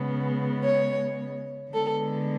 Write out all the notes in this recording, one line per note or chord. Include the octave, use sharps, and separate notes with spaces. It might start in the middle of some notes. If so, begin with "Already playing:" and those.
Already playing: C#3 G#3 B3
C#5
D3 G#3 B3 A4